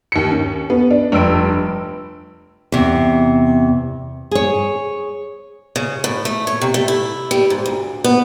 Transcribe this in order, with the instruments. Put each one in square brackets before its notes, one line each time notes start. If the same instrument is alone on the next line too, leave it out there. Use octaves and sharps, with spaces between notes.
[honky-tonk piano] D#2 C#7
C#4
B3
D4
F1 G2 E6 D7
[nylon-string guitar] E2 C3
G#4 C#5
[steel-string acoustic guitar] C#3
A2
A3
C#5
C3
A3
E4
G3
G#2
D2
B3